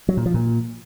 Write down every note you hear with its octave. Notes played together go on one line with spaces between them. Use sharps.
F#3
A#2
F3
A#2